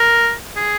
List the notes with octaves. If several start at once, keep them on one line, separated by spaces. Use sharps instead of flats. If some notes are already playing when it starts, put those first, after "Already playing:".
Already playing: A#4
G#4